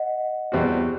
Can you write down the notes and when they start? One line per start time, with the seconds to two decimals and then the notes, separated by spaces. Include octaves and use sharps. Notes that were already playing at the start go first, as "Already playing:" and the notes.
Already playing: D#5 F#5
0.52 E2 B2 G3 C4 F#4